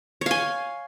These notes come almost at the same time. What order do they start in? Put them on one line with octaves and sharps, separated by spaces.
C#5 F5 G#5